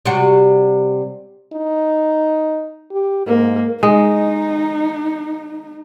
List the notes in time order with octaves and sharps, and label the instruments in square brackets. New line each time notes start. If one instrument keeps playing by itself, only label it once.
[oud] C3 G3 F#4
[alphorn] D#4
G4
[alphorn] G#2 [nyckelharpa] A#3
[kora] G#3 [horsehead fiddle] D#4